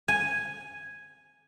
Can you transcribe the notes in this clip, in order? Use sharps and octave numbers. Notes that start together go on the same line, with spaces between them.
G#5